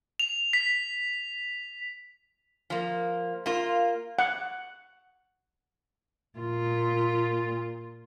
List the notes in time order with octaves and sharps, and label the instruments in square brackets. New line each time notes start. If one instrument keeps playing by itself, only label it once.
[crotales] F7
B6
[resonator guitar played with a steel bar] F3 A#3
A#3 F4
[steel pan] F#5
[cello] A#2 F4